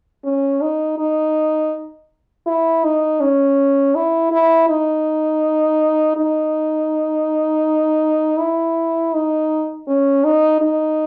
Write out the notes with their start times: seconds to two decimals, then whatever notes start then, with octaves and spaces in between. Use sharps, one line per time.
0.25 C#4
0.61 D#4
0.98 D#4
2.47 E4
2.84 D#4
3.20 C#4
3.95 E4
4.32 E4
4.69 D#4
6.17 D#4
8.39 E4
9.14 D#4
9.88 C#4
10.24 D#4
10.61 D#4